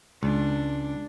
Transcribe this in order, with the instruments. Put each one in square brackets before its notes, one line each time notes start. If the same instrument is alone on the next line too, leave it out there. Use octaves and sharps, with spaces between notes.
[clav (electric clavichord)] C#2 [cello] D4